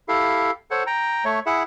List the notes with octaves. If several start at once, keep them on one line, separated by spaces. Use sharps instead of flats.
E4 G4 A4 F5
A4 C5 C#5 F#5
G5 A#5
A3 C#5
E4 G#4 E5 F#5